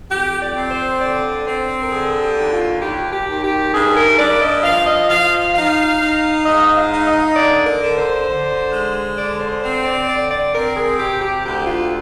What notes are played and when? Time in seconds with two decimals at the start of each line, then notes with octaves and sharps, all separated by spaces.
0.10 F2 G4
0.40 D5
0.55 C4
0.71 C5
1.01 D3 D5
1.46 C4 C5
1.83 A#4
1.91 D3 G#4
2.22 G4
2.37 D#2
2.52 F4
2.82 D#2 G4
3.13 G4
3.28 D#2
3.43 G4
3.73 G2 G#4
3.96 A#4
4.18 G2 D5
4.42 D#5
4.64 F3 F5
4.86 D#5
5.09 F3 F5
5.55 D#4 F5
6.00 D#4
6.45 G#2 D#5
6.76 F5
6.91 D#4
7.06 D#5
7.36 D3 D5
7.66 A#4
7.82 D3
7.97 C5
8.27 D3
8.72 G#3
9.18 D3 D5
9.40 C5
9.63 C4 C5
9.85 D5
10.08 D3 D5
10.31 D5
10.53 C4 A#4
10.77 G#4
10.99 C3 G4
11.21 G4
11.44 D2 G4
11.67 F4